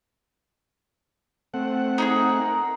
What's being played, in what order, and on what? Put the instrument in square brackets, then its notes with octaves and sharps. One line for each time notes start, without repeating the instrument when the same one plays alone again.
[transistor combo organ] A3 C4 F#5
[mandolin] D#4 E4 G#4
[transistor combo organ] A#4